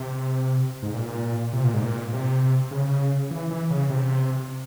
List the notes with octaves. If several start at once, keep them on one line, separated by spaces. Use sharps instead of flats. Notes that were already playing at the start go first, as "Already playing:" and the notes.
Already playing: C3
G#2
A#2
C3
A#2
G#2
A#2
C3
C#3
E3
E3
C#3
C3